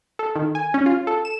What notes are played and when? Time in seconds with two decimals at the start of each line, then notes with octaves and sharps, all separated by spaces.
0.19 A4
0.36 D#3
0.55 G#5
0.74 C#4
0.86 F4
1.07 A4
1.25 E7